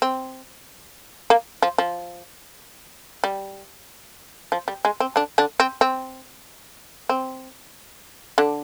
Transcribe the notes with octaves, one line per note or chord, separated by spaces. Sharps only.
C4
A#3
F3
F3
G3
F3
G3
G#3
C4
D3 D4
D3 D4
C4
C4
C4
D3 D4